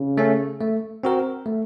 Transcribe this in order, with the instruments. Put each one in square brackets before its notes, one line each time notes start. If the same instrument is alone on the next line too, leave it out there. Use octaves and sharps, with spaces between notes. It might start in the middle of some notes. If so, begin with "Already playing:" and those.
Already playing: [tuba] C#3
[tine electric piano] A3 C#4
A3
C4 F#4 A#4
A3